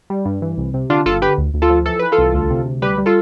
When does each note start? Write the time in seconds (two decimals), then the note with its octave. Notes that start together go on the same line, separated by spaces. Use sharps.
0.10 G3
0.25 G2
0.42 E3
0.58 C2
0.74 C3
0.90 D3 D4 F4
1.06 G1 F4 A4
1.22 D3 G4 B4
1.38 D2
1.54 D2
1.62 F4 A4
1.70 F3
1.86 E3 A4
1.99 E3 B4
2.12 F4 A4
2.18 C2
2.34 D2
2.50 C3
2.66 D2
2.82 G3 G4 B4
2.98 G3
3.06 F4 A4